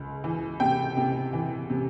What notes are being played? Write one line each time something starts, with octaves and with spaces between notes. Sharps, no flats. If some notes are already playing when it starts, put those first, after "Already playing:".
Already playing: C#2
E3
C3 G5
C3
E3
C3